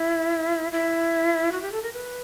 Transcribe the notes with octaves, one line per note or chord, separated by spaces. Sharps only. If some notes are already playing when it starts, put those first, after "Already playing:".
Already playing: E4
E4
F#4
G4
A4
A#4
B4